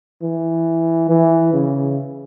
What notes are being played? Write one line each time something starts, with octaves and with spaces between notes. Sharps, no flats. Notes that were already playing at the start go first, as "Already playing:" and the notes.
E3
E3
C#3